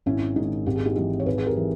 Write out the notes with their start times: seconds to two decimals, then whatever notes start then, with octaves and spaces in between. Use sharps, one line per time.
0.06 G#1 C#4 E4
0.36 G#2 D#3 D#4
0.66 G#1 G4
0.76 G#4
0.86 D#4 G4
0.96 G#2 E3 D#4 G4
1.20 C#5
1.26 G#1 G#4 B4
1.38 G#4
1.46 G4 A#4
1.57 E3